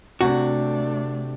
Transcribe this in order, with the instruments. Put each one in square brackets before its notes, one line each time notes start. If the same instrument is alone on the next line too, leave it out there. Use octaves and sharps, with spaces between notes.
[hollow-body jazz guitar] C3 F#4 [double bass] A3 D4